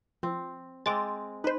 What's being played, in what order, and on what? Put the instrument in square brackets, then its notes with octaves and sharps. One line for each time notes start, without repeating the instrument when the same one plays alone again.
[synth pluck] F3 [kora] C4
[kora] G#3 C4 [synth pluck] D6 A6
[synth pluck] D#4 C5 [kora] B4